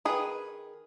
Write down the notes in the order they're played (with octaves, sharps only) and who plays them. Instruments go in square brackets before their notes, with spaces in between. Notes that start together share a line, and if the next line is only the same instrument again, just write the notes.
[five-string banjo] D#3 G#4 B4